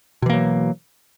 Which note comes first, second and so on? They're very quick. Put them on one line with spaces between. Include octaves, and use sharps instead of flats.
B2 E3 A#3 F#3